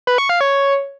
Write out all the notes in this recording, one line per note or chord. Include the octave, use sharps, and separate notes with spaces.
B4
C#6
F5
C#5